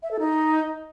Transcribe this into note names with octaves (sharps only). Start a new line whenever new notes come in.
E5
A4
D#4